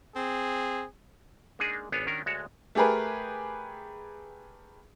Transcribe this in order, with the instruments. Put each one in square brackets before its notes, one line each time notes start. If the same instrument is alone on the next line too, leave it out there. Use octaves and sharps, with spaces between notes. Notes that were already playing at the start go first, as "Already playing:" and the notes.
[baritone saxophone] C4 [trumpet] G#4
[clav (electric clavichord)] G#3 A#3 D4 D#4 G#4
G#1 B3 D4 C#5 G#5
D#3 C#4 D4 F#4 A#4
D2 G#3 F#4 C#5 A5 A#5
[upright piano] A3 G4 G#4 A#4 B4